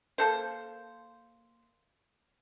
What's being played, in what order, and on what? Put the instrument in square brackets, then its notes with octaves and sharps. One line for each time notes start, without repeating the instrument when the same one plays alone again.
[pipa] A#3 A4 C5